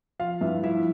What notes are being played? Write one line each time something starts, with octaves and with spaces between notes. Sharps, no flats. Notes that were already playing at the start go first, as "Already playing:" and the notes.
F3 F4 F5
G2 E4 E5
F3 E4 E5